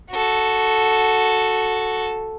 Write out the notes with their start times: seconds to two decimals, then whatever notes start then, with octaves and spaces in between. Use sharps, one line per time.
0.11 F#4 A4